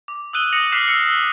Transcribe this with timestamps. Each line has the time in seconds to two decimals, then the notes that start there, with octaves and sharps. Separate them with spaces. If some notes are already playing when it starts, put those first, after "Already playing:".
0.08 D6
0.33 D#6 E6 F#6 D#7 G7
0.53 D#6 A#6 C#7 F7 F#7
0.72 D6 F6 F#6 B6 C7 E7
0.88 E6 C#7
1.06 E6